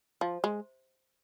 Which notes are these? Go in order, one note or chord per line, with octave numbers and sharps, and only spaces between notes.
F3
G#3